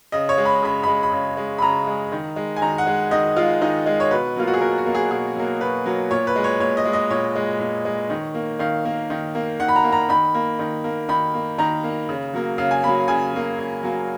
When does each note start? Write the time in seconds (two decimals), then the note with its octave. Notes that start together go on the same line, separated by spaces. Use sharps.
0.12 C#3 D#5
0.29 C#5
0.38 G#3
0.45 B5
0.62 C#3 B5
0.83 G#3 B5
1.03 B5
1.12 C#3
1.37 G#3
1.58 B5
1.62 C#3 A#5
1.87 G#3
2.12 D#3
2.36 G#3
2.56 G#5
2.62 D#3 A#5
2.78 F#5
2.87 G#3
3.11 D#3 D#5
3.36 G#3 F4
3.61 D#3 D#4
3.86 G#3
4.00 C#5
4.11 B2 B4
4.36 F#3 A#3 F4
4.47 F#4
4.54 G#4
4.61 B2 A#4
4.78 F#4
4.86 F#3 A#3
4.95 G#4
5.11 B2 G#4
5.36 F#3 A#3
5.61 B2 B4
5.86 F#3 A#3
6.11 A#2 C#5
6.27 B4
6.36 G#3
6.44 C#5
6.60 A#2 C#5
6.77 D#5
6.85 G#3
6.93 D#5
7.10 A#2 C#5
7.36 G#3
7.59 A#2
7.85 G#3
8.10 D#3
8.34 A#3
8.59 D#3 F5
8.85 A#3
9.10 D#3
9.35 A#3
9.60 D#3 F#5
9.68 B5
9.76 A#5
9.84 A#3
9.92 A#5
10.09 D#3 B5
10.34 A#3
10.59 D#3
10.84 A#3
11.09 D#3 B5
11.34 A#3
11.58 D#3 A#5
11.84 A#3
12.09 C#3
12.33 F#3 A#3
12.58 C#3 F5
12.71 G#5
12.83 F#3 A#3 B5
13.08 C#3 G#5
13.33 F#3 A#3
13.58 C#3
13.83 F#3 A#3